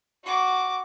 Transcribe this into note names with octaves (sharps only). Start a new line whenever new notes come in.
F#4 D6